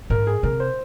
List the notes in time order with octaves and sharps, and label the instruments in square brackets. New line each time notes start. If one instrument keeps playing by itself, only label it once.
[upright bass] G#2 [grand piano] A#4
[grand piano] G#4
[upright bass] C3 [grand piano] A#4
[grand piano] C5